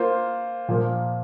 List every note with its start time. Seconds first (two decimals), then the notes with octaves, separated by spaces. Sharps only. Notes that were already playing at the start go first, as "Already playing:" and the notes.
Already playing: A#3 F4 C5
0.68 A#2 F3 A#3